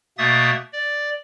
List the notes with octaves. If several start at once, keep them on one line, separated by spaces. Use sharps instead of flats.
B2 A3 A#3 E5 D#6 A6
D5